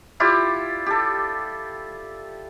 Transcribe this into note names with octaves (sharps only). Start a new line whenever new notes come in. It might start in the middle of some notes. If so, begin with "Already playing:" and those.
E4 F4 G4 D5
G4 A4